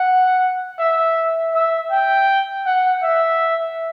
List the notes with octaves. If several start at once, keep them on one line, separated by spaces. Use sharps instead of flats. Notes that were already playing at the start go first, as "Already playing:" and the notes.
Already playing: F#5
E5
E5
G5
F#5
E5